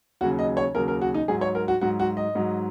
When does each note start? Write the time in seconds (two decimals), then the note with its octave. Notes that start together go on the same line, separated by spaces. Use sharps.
0.21 D#2 C#3 F#3 F#4
0.39 D#5
0.57 C#5
0.75 D#2 C#3 F#3 A#4
0.88 A#4
1.02 F#4
1.14 D#4
1.28 G#2 F#3 G#4
1.41 C#5
1.55 A#4
1.68 F#4
1.81 G#2 F#3 F#4
2.00 F#4
2.17 D#5
2.35 G#2 F#3